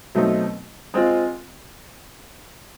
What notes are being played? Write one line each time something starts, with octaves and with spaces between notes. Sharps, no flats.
B2 F#3 A3 C4 D#4
G#3 C4 F4